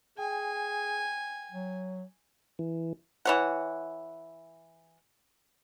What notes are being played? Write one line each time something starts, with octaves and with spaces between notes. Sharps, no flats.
G#4 G5 G#5
F#3
E3
E3 C#5 F#5